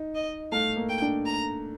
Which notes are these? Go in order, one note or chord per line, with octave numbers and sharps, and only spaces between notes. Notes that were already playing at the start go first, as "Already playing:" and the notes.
Already playing: D#4
D#5
A3 F5
A#3
G5
D4
A#5